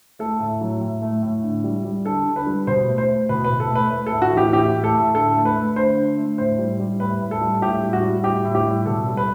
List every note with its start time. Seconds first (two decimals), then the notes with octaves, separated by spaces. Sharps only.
0.19 A3 A4
0.40 A2
0.61 F#3
0.81 A2
1.02 A3
1.23 A2
1.43 D3
1.64 G3
1.85 G3
2.05 D3 A4
2.26 D3
2.36 B4
2.47 G3
2.67 B2 C5
2.87 A3
2.98 C5
3.09 A3
3.29 B2 B4
3.44 B2 B4
3.60 A4
3.70 A3
3.75 B4
3.91 A3 B4
4.06 A4
4.12 A2
4.22 F#4
4.32 E3 G4
4.53 A2 G4
4.73 A3
4.84 A4
4.94 A2
5.15 D3 A4
5.35 A3
5.45 B4
5.56 A3
5.76 D3 C5
5.97 D3
6.18 A3
6.38 A2 C5
6.59 G3
6.80 G3
7.00 A2 B4
7.21 A2
7.31 A4
7.41 G3
7.62 A2 G4
7.83 G3
7.93 F#4
8.03 G3
8.24 A2 G4
8.45 A2
8.55 G4
8.65 G3
8.86 B2 A4
9.07 G3
9.17 B4